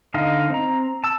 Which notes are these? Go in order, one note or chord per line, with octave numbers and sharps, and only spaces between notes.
D3 D#4 D#5 F5
C4 A#5
A5 E6